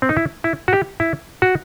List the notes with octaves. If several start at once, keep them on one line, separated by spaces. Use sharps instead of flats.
C4
D#4
E4
E4
F#4
G4
E4
F#4